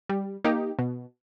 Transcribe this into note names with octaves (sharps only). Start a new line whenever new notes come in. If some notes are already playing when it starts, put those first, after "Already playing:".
G3
A#3 D#4 G4
B2